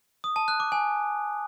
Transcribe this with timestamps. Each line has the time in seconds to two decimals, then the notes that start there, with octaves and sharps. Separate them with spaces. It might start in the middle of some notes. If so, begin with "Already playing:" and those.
0.24 D#6
0.36 A5
0.48 F#6
0.60 D6
0.72 G#5